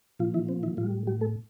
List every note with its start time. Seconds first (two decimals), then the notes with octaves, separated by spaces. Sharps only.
0.19 A#2 F3 F4
0.34 E3 E4
0.49 C4
0.63 E3 E4
0.77 A2 F3 G3 F4
1.07 G3 G4
1.21 A3 A4